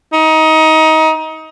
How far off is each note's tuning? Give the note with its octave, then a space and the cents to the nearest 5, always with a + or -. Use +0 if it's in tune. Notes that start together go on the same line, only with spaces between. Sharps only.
D#4 +25